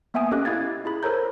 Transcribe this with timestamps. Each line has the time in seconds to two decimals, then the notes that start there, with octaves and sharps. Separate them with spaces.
0.14 A#3 B3 E5 G5 G#5 D#6
0.31 C#4 G4 A4 D#5 D6 F#6
0.45 E4 F5 G#6 A6
0.85 E4 G#4 B5
1.03 A4 A#4 C5 C#5 A#5 G6